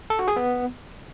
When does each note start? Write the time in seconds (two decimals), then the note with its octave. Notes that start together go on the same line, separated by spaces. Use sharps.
0.10 A4
0.19 F#4
0.28 G#4
0.36 B3